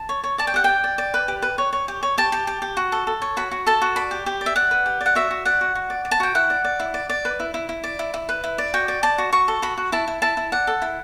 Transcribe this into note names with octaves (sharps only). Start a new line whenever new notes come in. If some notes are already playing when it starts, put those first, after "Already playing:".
Already playing: A5
C#5
C#5
D5 A5
G5
G4 F#5
D5 G5
D5
D5
B4
G4
B4
C#5
C#5
G4
C#5
G4 A5
G4
G4
G4
F#4
A4
A4
C#5
F#4 B5
F#4
A4 A5
F#4
D5 B5
G4
G4
D5
E5
D5 F#5
B4
G4
D5
F#5
F#4 E5
F#4
D5 F#5
F#4
F#4
D5
D5
A5
F#4 G5
E4 F#5
D5
D5
E4
D5
D5
B4
E4
E4
E4
D5
E4
E4
B4
E4
D5
F#4 G5
D5
D5 A5
F#4
F#4 C#6
A4
F#4 B5
F#4
E4 A5
E4
E4 A5
E4
D5 F#5
A4
E4